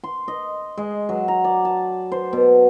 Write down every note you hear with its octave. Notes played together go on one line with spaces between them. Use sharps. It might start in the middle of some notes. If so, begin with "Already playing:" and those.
C6
D#5
G#3
F#3
A#5
D5
A5
C5
B2